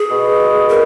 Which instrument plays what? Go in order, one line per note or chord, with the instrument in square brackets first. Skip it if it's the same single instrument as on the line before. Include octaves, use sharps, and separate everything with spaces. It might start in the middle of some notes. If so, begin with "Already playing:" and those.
Already playing: [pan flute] G#4
[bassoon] B2
[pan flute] A#4